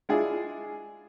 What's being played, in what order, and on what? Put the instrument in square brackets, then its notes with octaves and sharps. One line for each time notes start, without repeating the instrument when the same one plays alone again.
[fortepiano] G#3 D4 E4 F4 G#4